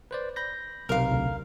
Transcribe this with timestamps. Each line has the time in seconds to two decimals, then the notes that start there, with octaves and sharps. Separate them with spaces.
0.11 B4 C5 D5
0.36 B5 G6 A#6
0.89 B1 C3 A#4 F5
1.12 D2